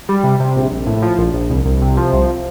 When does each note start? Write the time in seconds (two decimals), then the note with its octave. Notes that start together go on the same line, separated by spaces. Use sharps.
0.09 G3
0.23 C3
0.40 C3
0.56 A#1
0.71 A#1
0.86 A2
1.02 F3
1.18 A#1
1.33 A#1
1.50 C2
1.65 C2
1.82 C3
1.97 F3
2.13 C2